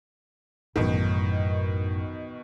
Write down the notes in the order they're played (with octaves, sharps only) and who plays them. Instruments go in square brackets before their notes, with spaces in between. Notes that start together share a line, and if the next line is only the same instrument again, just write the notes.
[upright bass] A1 F#2 [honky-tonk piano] B2 D#3